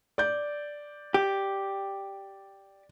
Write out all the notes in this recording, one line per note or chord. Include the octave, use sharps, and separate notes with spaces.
D5 G6
G4